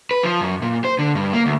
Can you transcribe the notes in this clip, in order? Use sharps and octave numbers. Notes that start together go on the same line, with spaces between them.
B4
F3
F#2
A#2
C5
D3
G2
A#3
D2